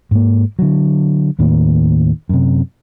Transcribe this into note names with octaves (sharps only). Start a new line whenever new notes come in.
G#2 A#3
D3 F#3
D#2 A2 D#3 A#3
F#2 C3